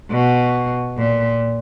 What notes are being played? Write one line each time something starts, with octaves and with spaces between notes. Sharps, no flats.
B2
A#2